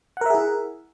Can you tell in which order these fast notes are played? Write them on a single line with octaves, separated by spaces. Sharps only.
F#5 A#4 E5 G#4 E4